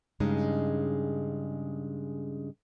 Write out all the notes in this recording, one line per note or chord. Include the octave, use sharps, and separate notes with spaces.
G2 C#3 G#3 C#4 D#4